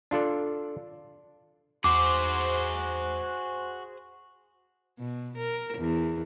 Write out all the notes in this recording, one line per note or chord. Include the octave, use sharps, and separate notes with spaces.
D4 F4 A4 D5
E2 F#4 G#4 C5 F#5 D6 F#6
B2
A#4
E2